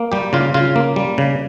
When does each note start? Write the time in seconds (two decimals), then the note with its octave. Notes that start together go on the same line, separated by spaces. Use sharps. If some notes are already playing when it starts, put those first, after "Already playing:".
Already playing: A#3
0.12 G3 G4
0.33 C#3 F4
0.54 C#3 F4
0.76 A#3
0.96 G3
1.18 C#3